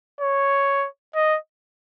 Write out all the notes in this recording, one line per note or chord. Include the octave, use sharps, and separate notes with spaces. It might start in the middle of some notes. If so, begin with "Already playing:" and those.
C#5
D#5